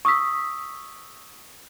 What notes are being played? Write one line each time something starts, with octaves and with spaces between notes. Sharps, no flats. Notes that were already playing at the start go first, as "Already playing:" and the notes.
C#6 D#6 E6 B6